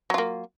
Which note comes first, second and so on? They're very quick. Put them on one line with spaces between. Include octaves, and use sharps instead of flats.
F#3 F4 A#3